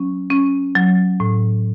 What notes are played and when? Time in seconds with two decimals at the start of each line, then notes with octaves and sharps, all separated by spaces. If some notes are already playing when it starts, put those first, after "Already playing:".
Already playing: F#3 C#4
0.30 C#4
0.75 F#3
1.20 A2